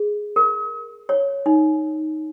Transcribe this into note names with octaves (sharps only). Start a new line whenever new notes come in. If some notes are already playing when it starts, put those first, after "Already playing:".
Already playing: G#4
A#4
C#5
D#4